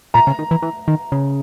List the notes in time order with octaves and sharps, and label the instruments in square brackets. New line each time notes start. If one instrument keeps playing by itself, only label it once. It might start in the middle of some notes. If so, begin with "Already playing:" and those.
[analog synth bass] A#2 [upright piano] A#5
[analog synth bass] C#3
D#3
E3
E3
D#3
C#3